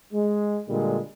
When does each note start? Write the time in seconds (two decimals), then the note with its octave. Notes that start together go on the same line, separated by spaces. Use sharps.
0.13 G#3
0.68 A#2 D3 G3 G#3